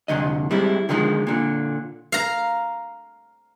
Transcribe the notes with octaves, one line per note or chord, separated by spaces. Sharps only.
C2 F2 D3 D#5
G3 G#3 C4 E4
D3 D#3 F3 G#3
A#2 D3
F5 A#5